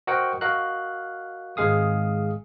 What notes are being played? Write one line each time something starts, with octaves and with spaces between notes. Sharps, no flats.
F#4 A#4 C5 D#5 F#5 G5
F#4 A#4 D#5 F5 F#6
G#1 G#3 G#4 F5 D#6